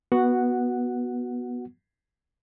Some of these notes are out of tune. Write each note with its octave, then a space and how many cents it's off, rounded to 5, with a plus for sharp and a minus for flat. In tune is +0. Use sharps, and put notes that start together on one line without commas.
B3 -15 F#4 +0 F#5 +0